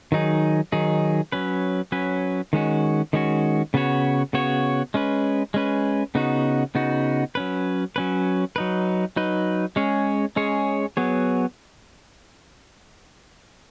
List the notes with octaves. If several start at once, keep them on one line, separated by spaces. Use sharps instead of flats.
D#3 F#3 D#4 G#4
D#3 F#3 D#4 G#4
F#3 C#4 B4
F#3 C#4 B4
D#3 G#3 C#4 F#4
D#3 G#3 C#4 F#4
C#3 B3 F#4 C#5
C#3 B3 F#4 C#5
G#3 C#4 B4
G#3 C#4 B4
C#3 B3 D#4 F#4
C#3 B3 D#4 F#4
F#3 C#4 B4
F#3 C#4 B4
F#3 D#4 B4
F#3 D#4 B4
G#3 C#4 G#4 C#5
G#3 C#4 G#4 C#5
F#3 B3 G#4 C#5